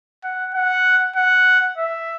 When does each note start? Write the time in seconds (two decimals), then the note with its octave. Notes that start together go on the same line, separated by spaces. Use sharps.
0.24 F#5
0.54 F#5
1.16 F#5
1.78 E5